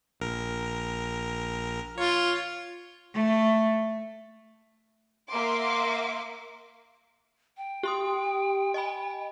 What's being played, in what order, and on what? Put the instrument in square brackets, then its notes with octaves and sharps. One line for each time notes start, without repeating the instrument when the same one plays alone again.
[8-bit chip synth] A#1 A#4
[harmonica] F4 [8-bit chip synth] C#5
[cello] A3
[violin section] A#3 E5 F#5 C6 D6
[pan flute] G5
[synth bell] G4 C6 D#6
D#5 G#5 B5